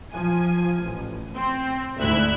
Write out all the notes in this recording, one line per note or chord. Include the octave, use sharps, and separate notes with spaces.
F3 G#5
A1
C4
D2 G#2 E4 E5 F#6